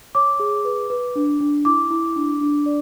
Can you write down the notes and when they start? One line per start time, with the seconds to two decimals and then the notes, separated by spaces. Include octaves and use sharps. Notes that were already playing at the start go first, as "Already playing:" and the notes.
0.15 C#5 D6
0.40 G#4
0.65 B4
0.90 B4
1.16 D4
1.40 D4
1.65 E4 D6
1.91 E4
2.16 D4
2.41 D4
2.66 D5